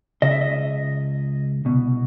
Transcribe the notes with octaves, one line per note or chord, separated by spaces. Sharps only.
C#2 C#3 D#5
E5
D#5
C2 B2